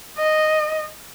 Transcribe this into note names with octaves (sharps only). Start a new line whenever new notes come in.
D#5